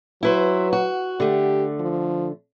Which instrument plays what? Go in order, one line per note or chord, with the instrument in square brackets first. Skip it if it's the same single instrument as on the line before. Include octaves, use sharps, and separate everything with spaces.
[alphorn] F#3 [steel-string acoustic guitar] E4 B4 C5
[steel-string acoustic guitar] F#4
[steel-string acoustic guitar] D3 A3 [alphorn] G4
[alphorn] F3